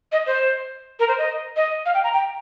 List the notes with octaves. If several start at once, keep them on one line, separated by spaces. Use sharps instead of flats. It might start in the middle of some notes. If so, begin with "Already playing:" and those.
D#5
C5
A#4
C5
D#5
D#5
F5
G5
A#5
G5